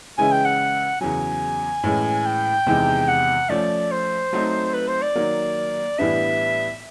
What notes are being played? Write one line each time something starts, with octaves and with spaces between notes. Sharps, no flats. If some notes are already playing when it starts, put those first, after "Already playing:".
C#3 E3 G#3 C#4 E4 G#5
G5
F#5
E2 C#3 F#3 G#5
A2 E3 G#3 C#4
G5
E2 C3 D#3 G#3
F#5
F3 A3 C#4 D5
C5
F#3 A3 C4 D#4
B4
C5
D5
D#3 F#3 A#3
A2 E3 G3 B3 D4 E5